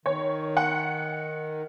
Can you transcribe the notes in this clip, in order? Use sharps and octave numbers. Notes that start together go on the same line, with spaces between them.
D#3 C#5
F#5